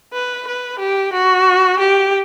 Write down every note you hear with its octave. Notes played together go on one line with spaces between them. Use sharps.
B4
B4
G4
F#4
G4